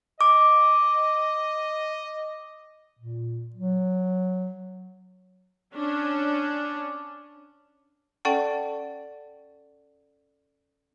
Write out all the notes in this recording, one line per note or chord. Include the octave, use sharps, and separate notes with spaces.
D#5 D6
A#2
F#3
C#4 D4
C#4 A4 D5 F#5 G5 A5